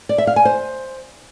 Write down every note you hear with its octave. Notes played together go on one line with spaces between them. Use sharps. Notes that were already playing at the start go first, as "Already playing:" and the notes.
D5
E5
F5
G#5
C5